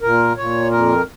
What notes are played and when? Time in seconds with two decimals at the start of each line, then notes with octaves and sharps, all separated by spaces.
0.02 A#2 A#4
0.37 A#2 C#5
0.71 F2 A#4